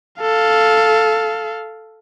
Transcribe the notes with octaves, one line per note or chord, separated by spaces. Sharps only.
A4 F5